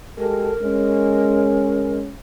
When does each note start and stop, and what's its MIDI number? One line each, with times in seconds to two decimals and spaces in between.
0.18 0.51 56
0.18 0.51 67
0.18 0.51 69
0.18 1.98 70
0.62 2.11 56
0.62 2.11 61